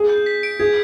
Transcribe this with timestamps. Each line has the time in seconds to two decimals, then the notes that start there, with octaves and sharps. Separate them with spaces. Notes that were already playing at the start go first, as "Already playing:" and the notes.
Already playing: G#4
0.09 G6
0.26 B6
0.43 D7
0.60 G#4 G#6